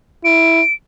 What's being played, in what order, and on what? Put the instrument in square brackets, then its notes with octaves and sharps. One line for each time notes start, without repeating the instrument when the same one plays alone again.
[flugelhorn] E4 [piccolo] D7